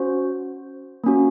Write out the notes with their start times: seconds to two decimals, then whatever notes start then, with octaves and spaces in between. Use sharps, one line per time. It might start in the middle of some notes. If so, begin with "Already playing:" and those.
Already playing: C#4 F#4 C5
1.04 A#3 C#4 F#4